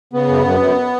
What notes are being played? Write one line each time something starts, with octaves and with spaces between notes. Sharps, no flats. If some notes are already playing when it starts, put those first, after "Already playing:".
C#3 B3
F#2
F#2
F#2